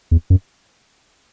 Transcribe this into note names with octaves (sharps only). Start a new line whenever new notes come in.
E2
F#2